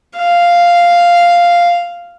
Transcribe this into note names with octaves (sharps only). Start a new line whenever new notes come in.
F5